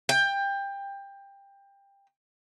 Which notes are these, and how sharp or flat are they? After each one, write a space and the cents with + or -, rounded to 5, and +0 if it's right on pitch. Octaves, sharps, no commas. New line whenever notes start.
G5 +20